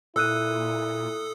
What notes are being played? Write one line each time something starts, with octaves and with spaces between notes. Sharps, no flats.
A#2 E4 A4 D#6 E6 F#6 D#7